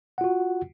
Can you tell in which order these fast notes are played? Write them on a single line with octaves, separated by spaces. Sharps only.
F#5 F4 F#4